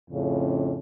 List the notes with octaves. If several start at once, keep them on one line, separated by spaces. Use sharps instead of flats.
F2 A2 C#3